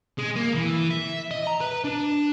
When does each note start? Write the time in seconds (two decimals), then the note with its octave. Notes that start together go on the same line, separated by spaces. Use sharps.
0.18 G#3
0.36 A#3
0.55 E3
0.91 E5
1.31 D#5
1.47 A#5
1.61 B4
1.84 D4